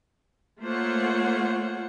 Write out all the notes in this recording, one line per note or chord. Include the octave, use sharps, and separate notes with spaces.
A3 A#3 F4 C5 C#5 F#5